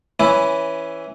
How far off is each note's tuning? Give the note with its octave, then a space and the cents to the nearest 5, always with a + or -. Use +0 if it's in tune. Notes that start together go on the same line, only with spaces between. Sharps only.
E3 +0 C#4 +0 E4 +0